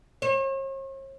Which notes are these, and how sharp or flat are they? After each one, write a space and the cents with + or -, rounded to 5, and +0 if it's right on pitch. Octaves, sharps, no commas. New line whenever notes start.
C#5 -45